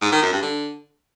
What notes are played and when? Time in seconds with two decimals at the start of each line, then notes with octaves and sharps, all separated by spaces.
0.02 G#2
0.12 D#3
0.22 F#2
0.32 G2
0.42 D3